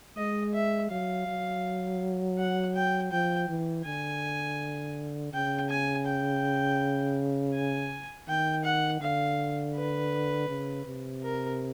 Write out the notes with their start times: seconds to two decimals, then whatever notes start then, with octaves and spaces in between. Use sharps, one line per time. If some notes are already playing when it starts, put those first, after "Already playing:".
0.17 G#3 D#5
0.54 E5
0.91 F#3 F5
1.27 F#3
2.38 F#5
2.75 G5
3.12 F3 G5
3.49 E3
3.85 D3 G#5
5.33 C#3 G5
5.70 G#5
6.06 G5
7.54 G#5
8.28 D#3 G5
8.64 F#5
9.01 D3 F5
9.75 B4
10.49 C#3
10.86 C3
11.23 A#4